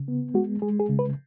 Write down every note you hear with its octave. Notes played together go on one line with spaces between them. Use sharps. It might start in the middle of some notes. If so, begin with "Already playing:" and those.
Already playing: C#3
B3
G#3 F#4
G#3 G#4
G#4
C#3
B4